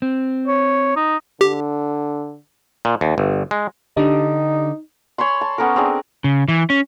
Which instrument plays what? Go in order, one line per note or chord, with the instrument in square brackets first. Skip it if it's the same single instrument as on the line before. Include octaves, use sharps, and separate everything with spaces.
[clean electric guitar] C4
[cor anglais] C#5
D#4
[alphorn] D3 [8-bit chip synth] G4
[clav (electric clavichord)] A#2
D#2
G1
G#3
[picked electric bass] D3 [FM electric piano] D4 G4 [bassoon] D#4
[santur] C#5 G#5 B5 C6
A5
B3 C#4 A4 A#4
C4 D4 G#4
[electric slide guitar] C#3
E3
C#4